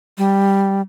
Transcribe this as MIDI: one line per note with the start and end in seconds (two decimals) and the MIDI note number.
0.18 0.81 55